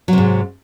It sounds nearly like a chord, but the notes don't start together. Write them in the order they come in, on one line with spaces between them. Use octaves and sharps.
F#3 C3 G#2